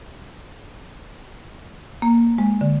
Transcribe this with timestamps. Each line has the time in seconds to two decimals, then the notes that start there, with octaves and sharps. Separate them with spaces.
2.02 A#3
2.38 G#3
2.61 D3